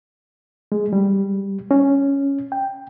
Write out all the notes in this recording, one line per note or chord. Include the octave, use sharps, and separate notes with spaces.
G#3
G3
C#4
G5